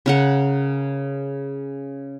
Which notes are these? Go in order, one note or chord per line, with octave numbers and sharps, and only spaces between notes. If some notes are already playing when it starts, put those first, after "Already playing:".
C#3 A#4 F#5